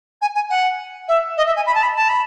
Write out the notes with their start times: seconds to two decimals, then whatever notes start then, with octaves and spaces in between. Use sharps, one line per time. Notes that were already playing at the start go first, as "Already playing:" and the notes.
0.21 G#5
0.35 G#5
0.50 F#5
1.08 E5
1.37 D#5
1.46 E5
1.56 G#5
1.66 B5
1.74 A5
1.82 B5
1.96 A5
2.09 B5